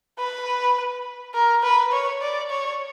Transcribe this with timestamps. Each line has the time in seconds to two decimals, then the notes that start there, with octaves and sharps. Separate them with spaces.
0.19 B4
1.34 A#4
1.63 B4
1.92 C#5
2.21 D5
2.50 C#5